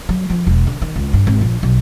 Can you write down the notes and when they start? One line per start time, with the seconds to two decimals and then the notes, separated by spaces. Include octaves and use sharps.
0.09 F#3
0.30 F3
0.47 E1
0.67 D3
0.82 D#3
0.96 C#2
1.13 G2
1.27 G#1
1.41 A#1
1.63 B1